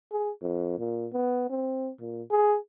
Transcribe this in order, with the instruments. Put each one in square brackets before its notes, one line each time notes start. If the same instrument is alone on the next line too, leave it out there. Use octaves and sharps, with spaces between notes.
[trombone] G#4
F2
A#2
B3
C4
A#2
G#4